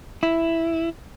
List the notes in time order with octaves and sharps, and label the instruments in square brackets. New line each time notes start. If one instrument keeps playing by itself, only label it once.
[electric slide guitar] E4